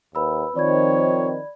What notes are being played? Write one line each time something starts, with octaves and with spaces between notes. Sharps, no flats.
D#2 B4 B5 E6
D#3 F3 C4 C#5 D5 B5 G#6